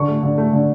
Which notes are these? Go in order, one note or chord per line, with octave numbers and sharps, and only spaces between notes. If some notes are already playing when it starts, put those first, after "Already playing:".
Already playing: D3 C#6
A3
D3
A3
D3